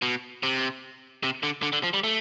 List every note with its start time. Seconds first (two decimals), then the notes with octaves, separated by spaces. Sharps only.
0.02 B2
0.43 C3
1.23 C3
1.43 D3
1.63 D3
1.73 D3
1.83 F3
1.94 G3
2.04 A3